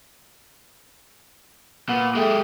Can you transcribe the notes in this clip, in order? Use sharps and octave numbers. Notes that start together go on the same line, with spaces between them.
A#2 B3
G#3 A3 G4